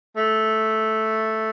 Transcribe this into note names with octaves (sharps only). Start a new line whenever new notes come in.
A3